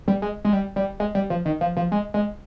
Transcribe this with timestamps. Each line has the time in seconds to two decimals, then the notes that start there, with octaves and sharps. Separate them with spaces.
0.08 G3
0.22 G#3
0.45 G#3
0.53 G3
0.76 G3
1.00 G#3
1.15 G3
1.30 F3
1.45 D#3
1.61 F3
1.77 F3
1.92 G#3
2.14 G#3